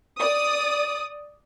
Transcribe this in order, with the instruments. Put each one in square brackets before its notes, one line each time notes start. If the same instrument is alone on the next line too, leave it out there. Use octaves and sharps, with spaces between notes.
[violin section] D5 D#6